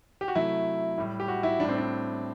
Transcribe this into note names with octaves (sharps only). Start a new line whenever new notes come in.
G4
F#4
C3 F#3 A3 E4
A2 G3
G4
F#4
E4
A2 G3 D4
C4
D4